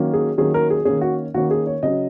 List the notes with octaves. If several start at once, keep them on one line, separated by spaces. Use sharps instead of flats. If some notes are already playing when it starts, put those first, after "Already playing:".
Already playing: D#3 F#3 A#3 C#4
G#4
D#3 F#3 A#3 C#4 G#4
A#4
G#4
D#3 A#3 C#4 G#4
F#4
D#3 A#3 C#4 F#4
G#4
C#5
C#3 F#3 C#4 D#5